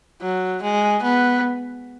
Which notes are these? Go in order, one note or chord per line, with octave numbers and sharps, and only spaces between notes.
F#3
G#3
B3